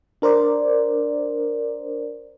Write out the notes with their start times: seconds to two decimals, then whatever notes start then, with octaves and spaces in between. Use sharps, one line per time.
0.22 D4 A#4 C5 D5